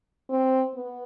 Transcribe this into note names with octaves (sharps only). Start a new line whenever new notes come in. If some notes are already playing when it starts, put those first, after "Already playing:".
C4
B3